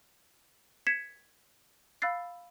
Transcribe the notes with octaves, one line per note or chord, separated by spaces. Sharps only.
G#6 B6 C#7 E7
F5 B5 E6 F#6 A6 C7